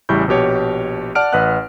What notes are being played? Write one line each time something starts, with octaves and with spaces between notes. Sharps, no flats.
A1 C#3 G3 E4 C#6 G6
A#1 B2 G4 C#5
D5 F#5 A5 F6 D7
A1 B4 D#5 F#5 F#6